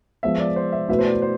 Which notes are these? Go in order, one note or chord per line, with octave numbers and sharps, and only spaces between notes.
F3 G#3 B3 E5
D5
C5
E5
B2 A3 E4 B4 E5
C5
D5
C5